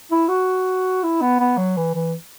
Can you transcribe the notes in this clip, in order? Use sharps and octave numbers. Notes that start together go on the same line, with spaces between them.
E4
F#4
E4
B3
B3
F#3
E3
E3